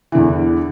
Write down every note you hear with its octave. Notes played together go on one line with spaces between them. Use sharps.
E2 D3 E3